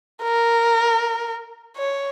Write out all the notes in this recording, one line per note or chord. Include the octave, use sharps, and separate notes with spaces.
A#4
C#5